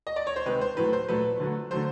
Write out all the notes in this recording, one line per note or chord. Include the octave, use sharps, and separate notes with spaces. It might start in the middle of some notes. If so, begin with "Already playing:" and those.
D#5
D5
C#5
C5
C3 D#3 G#3 B4
C5
A2 F#3 A3 B4
C5
A#2 F#3 A3 B4
D3 F#3 A3
D3 F#3 A3 C5